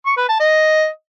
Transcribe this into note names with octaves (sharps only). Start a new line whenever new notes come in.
C#6
B4
A5
D#5